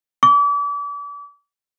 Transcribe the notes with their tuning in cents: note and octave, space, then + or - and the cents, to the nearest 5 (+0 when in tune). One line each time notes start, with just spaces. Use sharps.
D6 -35